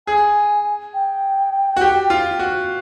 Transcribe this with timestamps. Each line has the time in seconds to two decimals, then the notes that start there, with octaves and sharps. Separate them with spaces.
0.07 G#4 G#5
0.94 G5
1.77 F#4
1.81 G4
2.10 F4
2.39 F#4